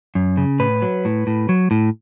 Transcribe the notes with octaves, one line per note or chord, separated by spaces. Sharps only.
F#2
C#3
A2 B4
F#3
A2
A2
F#3
A2